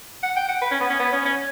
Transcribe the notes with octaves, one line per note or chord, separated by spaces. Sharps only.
F#5
G5
F#5
B4
C#4
B3
C#4
B3
C#4
C#4